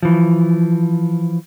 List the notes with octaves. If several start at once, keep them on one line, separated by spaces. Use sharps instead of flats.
E3 F3